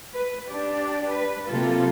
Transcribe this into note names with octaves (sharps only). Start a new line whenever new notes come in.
B4
D4 G4 D5
B4
C3 F#3 A#3 F4 A4